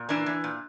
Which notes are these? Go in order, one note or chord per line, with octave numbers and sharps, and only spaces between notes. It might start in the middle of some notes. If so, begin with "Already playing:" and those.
Already playing: A#2
E3 A#3 D4
E3
A#2